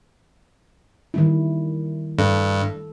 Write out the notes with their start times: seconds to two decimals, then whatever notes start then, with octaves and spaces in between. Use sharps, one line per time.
1.14 D#3 G3 E4
2.19 G2 A4